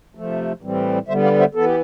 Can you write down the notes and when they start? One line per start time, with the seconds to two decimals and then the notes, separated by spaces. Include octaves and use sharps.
0.15 C3 F3 A3
0.61 A2 E3 G3 C4
1.08 D3 G3 B3 C5 E5
1.24 D5 F5
1.39 C5 E5
1.55 E3 B3 A4
1.65 G4